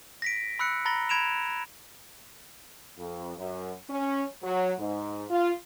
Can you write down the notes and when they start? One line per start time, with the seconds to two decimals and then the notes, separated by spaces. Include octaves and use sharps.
0.22 A#6 B6 D7
0.59 B5 E6 F#6 C#7
0.85 A#5 B5 A6 A#6 G7
1.09 B5 G#6 D7 E7 F7
2.98 F2
3.38 F#2
3.90 C#4
4.43 F#3
4.79 G#2
5.30 F4